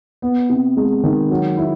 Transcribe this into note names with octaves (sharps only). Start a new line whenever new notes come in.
B3
C3
G#3
D#3
F#3
E4